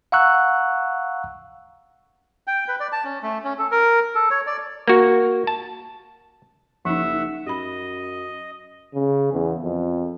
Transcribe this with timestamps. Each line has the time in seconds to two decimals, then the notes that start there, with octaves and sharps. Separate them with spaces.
0.12 F5 F#5 A#5 C#6 E6 F#6
2.47 G5
2.68 B4
2.80 D5
2.92 A5
3.05 C#4
3.23 A3
3.44 C#4
3.59 A4
3.72 A#4
4.15 A4
4.31 C#5
4.47 D5
4.88 A#3 F#4
5.47 A5
6.85 F#1 F3 D#4 E5 F#5
7.46 F#2 G4 D#5 B5
8.94 C#3
9.33 E2
9.64 F2